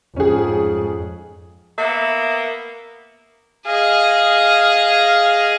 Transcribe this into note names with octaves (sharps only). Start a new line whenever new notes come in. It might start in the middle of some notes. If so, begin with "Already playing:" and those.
F2 G#2 C#4 G#4
A#3 B3 E5
G#4 D#5 F5